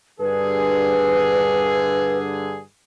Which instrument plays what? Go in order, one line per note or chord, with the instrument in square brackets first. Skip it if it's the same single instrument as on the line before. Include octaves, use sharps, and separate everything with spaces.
[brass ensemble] G2 D3 G#4 [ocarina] B4